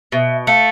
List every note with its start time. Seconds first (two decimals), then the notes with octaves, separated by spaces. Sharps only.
0.12 B2 E5
0.47 A3 F5